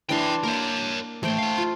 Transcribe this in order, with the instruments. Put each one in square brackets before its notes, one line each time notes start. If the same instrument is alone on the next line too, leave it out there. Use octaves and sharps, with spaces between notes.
[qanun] E3 D4 C6 [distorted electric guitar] C#5 G5
[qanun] A#3 [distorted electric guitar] A#4 C#5
[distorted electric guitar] A2 E3 [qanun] A3 C5 G5
[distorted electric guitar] E4 F5
[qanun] F4